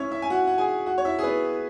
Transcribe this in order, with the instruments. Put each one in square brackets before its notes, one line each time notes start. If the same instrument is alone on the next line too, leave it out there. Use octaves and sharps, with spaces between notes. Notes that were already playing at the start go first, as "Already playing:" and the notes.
Already playing: [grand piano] C#4 E4 C#5 E5
E4 E5
G#5
F#4 F#5
F#5
G#4 G#5
F#4 F#5
C#5
E4 E5
G#4
B3 B4